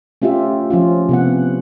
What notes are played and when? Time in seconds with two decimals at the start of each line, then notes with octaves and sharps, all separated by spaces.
0.22 A3 C#4 F4 G4 E5
0.70 F3 C#4 F4
1.09 C3 B3 F#5